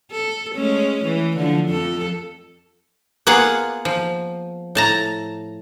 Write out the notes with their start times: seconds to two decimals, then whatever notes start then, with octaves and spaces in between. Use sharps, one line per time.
0.12 A4
0.55 G#3 A3 C#4
1.05 E3
1.37 D3 F3
1.69 F2 F3 A4
3.27 A#3 B3 F4 G#4 F#5
3.85 F3
4.75 A2 A5 A#5